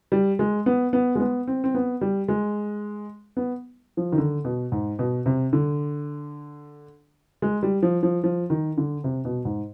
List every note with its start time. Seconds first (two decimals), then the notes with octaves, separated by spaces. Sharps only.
0.12 G3
0.39 G#3
0.66 B3
0.93 B3
1.15 G#3
1.20 B3
1.47 C4
1.64 C4
1.75 B3
2.01 G3
2.28 G#3
3.37 B3
3.97 F3
4.12 D#3
4.18 D3
4.44 B2
4.72 G#2
4.99 B2
5.26 C3
5.53 D3
7.42 G#3
7.63 G3
7.83 F3
8.03 F3
8.24 F3
8.50 D#3
8.77 D3
9.04 C3
9.25 B2
9.45 G#2